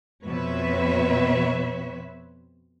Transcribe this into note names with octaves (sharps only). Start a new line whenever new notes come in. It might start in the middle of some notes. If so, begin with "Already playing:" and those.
F2 B2 C4 B4 C#5 E5